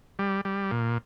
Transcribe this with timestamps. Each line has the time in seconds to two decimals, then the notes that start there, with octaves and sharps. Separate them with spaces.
0.19 G3
0.45 G3
0.71 A#2